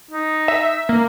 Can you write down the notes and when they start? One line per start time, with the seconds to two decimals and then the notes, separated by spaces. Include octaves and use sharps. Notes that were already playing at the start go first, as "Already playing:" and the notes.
0.11 D#4
0.48 E5
0.89 A#3